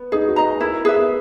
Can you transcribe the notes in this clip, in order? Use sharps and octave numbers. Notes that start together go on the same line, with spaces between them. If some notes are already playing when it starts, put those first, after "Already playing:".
Already playing: B3
D#4 G#4
F#4
D#5 A#5
G#4
E4 A#4
A#4
G#4 B4 E5
B3